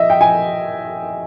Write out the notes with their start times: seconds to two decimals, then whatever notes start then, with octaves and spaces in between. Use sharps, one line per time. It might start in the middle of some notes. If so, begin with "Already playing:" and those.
Already playing: D#5 E5
0.10 G5
0.21 G#5